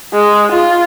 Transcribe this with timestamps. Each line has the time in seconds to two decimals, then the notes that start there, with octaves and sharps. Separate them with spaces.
0.13 G#3
0.52 F4